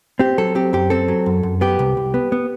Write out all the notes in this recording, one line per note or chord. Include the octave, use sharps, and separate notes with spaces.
C4 G4
F#3 A4
C4 G4
F#2 G4
C4 A4
F#3
F#2
F#2
B3 G4
C2
C2
B3
B3